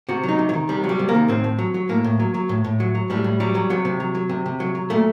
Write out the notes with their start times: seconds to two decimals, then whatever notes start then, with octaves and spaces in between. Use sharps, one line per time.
0.09 C3 F#4
0.23 F#3
0.29 D#4
0.39 C3
0.49 F#3
0.53 D#3
0.69 C3 G3
0.84 F#3
0.89 G3
0.99 C3
1.09 A#3
1.14 D#3
1.28 A2 C4
1.44 A2
1.59 F#3
1.74 F#3
1.89 A2 A#3
2.04 A2
2.19 F#3
2.34 F#3
2.49 A2
2.65 A2
2.80 F#3
2.95 F#3
3.10 A2 G3
3.24 A2
3.40 F#3 G3
3.55 F#3
3.70 C3 F#3
3.85 C3
4.00 F#3
4.15 F#3
4.29 C3
4.46 C3
4.60 F#3
4.75 F#3
4.90 A#2 A3